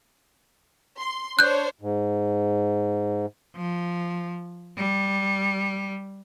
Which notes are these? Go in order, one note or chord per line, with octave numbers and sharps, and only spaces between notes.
C6
D4 C5 C#5 F#6 G6
G#2
F3
G3